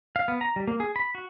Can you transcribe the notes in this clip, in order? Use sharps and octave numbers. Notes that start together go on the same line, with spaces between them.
F5
B3
A#5
G3
A#3
G#4
B5
F#4